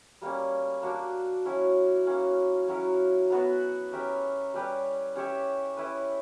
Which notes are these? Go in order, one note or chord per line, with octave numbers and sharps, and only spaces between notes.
G3 A#3 C#4
A#3 D4 F#4
F#3 C#4 E4
A#3 C#4 F#4
F#3 C#4 E4 A#4
F#3 B3 F#4
C#4 G4 A#4 E5
G3 C#4 G4 B4
C#4 G4 C#5 E5
C#4 E4 B4